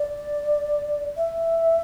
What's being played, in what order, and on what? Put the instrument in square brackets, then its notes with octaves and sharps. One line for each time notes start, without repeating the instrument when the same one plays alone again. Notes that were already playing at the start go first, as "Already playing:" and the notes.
Already playing: [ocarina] D5
E5